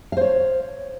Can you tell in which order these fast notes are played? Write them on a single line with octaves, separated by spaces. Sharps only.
F5 C5 C#5